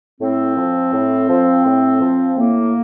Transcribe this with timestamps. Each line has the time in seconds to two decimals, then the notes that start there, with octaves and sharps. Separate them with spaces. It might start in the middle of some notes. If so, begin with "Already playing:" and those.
0.21 A2 C4
0.57 F3
0.93 A2
1.29 F3
1.65 A2
2.01 F3
2.37 A2 A#3